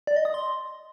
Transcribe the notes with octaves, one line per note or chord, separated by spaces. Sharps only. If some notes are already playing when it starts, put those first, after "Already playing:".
D5
D#5
D#6
C6